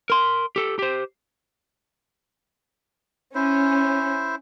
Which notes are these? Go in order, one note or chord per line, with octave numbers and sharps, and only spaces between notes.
A#4 C6
G4 A4
G4 C5
C#4 E4 C5